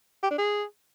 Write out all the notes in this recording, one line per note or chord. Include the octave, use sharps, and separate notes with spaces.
G4
D4
G#4